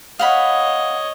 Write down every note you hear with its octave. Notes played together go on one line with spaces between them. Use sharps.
C#5 D#5 F5 F#5 B5